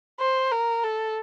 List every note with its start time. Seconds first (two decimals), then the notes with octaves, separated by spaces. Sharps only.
0.20 C5
0.52 A#4
0.84 A4